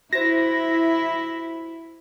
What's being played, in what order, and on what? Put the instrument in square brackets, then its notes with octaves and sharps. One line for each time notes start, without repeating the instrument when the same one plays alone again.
[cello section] E4 [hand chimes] F#4 C5 [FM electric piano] A#6